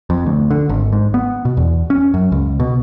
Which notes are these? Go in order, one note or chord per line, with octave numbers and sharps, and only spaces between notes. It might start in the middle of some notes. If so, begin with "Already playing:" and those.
F2
D2
D3
G#1
G#2
B3
B2
E2
C#4
F#2
C#2
B2